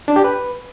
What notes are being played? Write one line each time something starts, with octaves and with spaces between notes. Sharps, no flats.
D4
G4
B4